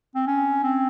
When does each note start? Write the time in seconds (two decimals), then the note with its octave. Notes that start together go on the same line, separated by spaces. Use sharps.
0.15 C4
0.27 C#4
0.64 C4